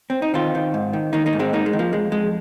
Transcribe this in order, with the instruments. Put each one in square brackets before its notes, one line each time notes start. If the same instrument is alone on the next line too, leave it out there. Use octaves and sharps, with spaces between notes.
[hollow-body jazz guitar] C4
D#4
D#3 C4 F4
D#3
G#2
D#3
D#3 A#3 D#4
A#3 D#4
G#2
G#3 C4
G#2 A#3 D#4
G#3
D#3
F3 A#3
F2 G#3
F2 G#3